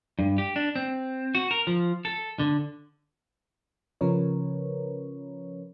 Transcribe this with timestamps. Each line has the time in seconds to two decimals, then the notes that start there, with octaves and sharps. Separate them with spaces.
0.19 G2
0.38 G4
0.56 D4
0.76 C4
1.35 F#4
1.51 A#4
1.67 F3
2.05 A4
2.39 D3
4.01 C#3 F3 C#4 A#4 B4 C#5